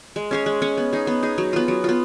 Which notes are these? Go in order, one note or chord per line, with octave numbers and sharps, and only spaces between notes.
G#3
C#4 G#4 C#5
G#3
C#4 G#4 C#5
B3
D#4 G#4
B3
D#4 G#4
F#3
B3 F4
F#3
B3 F4